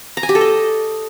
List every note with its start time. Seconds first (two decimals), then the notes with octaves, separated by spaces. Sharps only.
0.17 A#5
0.23 G#5
0.29 G4
0.35 A4
0.41 D#5